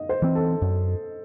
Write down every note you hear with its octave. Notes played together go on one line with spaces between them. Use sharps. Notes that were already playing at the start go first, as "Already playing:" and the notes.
Already playing: D#5
C5
E3 C4
A4
F#2